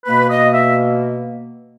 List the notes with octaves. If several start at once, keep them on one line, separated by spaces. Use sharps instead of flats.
B2 A#3 B4
D#5
E5